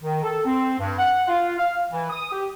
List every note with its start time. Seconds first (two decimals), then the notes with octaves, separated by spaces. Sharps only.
0.02 D#3
0.23 A4
0.45 C4
0.79 G2
0.98 F#5
1.28 F4
1.58 F5
1.91 E3
2.10 D#6
2.32 G4